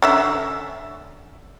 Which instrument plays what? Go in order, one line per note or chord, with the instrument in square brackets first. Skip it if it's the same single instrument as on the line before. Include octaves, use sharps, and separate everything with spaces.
[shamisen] D3 C#4 E5